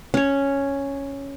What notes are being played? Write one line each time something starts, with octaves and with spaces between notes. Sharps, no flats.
C#4 C#5